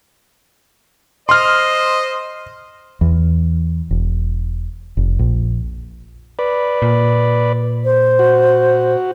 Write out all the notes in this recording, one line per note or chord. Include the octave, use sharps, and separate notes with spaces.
C5 D#5 C6 F6
E2
E1
F1
A#1
B4 D5
A#2
C5
F#4